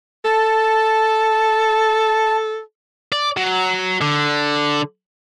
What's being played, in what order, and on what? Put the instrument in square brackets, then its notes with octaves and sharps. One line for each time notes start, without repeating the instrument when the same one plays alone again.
[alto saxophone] A4 [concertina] A5
[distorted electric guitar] D5
F#3
D3